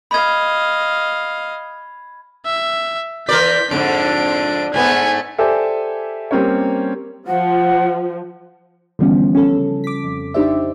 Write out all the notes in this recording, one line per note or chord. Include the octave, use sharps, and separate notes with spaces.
D#5 F5 B5 G#6
E5
E3 A#4 D5 G6 B6
F2 G#2 D3 D4 D7
G#2 A3 B3 G#5
G4 A4 C5 D5 E5 G#5
G3 A#3 C4 C#4 A#4 C#5
F3 F#5
D3 E3 F3 G3 B3 C#4
C#4 A4
C#3
D6 B6
F2
D4 D#4 G4 C5 D5 E5